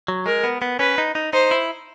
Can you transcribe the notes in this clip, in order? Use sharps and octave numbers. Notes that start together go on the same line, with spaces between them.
F#3
G#3 A#4
B3
B3
C#4 B4
D#4
D#4
D#4 C5
E4